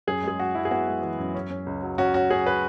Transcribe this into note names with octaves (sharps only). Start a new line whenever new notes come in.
F#2 G#4
G#3 G#4
G#3 F#4
F#2 E4
G#4
B3 F#4
G#3
E3
F#2
C#4
C#4
C#2
F#3
C#4 F#4
C#4 F#4
C#4 G#4
B4